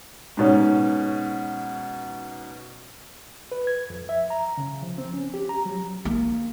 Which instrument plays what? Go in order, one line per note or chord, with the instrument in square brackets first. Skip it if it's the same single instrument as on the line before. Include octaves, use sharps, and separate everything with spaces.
[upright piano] G#2 B2 C#4
[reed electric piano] B4
G#6
F2
E5
A#5
C#3
F3
C4
C#4
G4
A#5
F#3
[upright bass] A#3